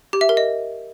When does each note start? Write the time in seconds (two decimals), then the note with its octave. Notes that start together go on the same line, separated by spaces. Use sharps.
0.13 G4
0.21 E5
0.29 A#4
0.37 D#5